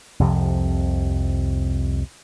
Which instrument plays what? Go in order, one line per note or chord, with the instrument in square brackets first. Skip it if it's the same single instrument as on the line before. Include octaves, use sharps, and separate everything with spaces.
[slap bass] C2 F2 C3 F3